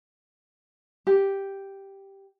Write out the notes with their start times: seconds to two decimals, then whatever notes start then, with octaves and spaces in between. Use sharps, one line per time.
1.07 G4